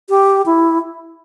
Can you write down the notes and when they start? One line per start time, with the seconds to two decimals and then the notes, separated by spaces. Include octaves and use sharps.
0.09 G4
0.46 E4